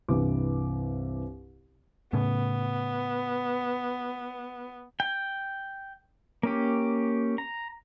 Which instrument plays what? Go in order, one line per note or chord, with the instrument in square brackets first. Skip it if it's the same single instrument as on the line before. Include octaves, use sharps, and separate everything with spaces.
[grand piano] C2 G2 E3 C4 D6
[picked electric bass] A2 C#3 [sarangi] B3
[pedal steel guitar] G5
A#3 C#4 G4
A#5